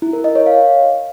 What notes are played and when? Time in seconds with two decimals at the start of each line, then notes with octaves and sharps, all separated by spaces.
0.02 E4
0.13 A#4
0.24 D#5
0.35 C#5
0.47 F5